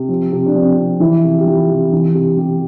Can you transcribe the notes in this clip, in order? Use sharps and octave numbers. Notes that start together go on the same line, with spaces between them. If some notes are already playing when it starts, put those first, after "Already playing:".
Already playing: C3
F3
C3
D4
F3 C4
C3
E3 E4
C3
G4
E3 F4
C3
E3
C3
E3 G4